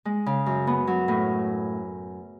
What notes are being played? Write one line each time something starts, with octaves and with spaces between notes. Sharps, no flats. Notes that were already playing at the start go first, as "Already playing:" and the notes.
G#3
C#3
F#2
B3
F#3
A2